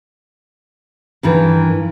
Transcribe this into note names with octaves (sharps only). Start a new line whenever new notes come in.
G2 D#3 E3